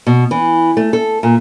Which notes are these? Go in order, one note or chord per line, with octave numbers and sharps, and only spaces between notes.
B2
E3
A3
A4
A#2